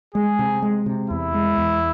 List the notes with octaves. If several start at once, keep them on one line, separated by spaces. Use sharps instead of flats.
G#3 G#4
C3
G#3
C3
E2 E4
G#3
E2